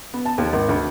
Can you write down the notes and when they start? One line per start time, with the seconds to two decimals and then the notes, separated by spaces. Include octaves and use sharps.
0.14 B3
0.25 A5
0.38 D#2
0.53 G#1
0.69 D2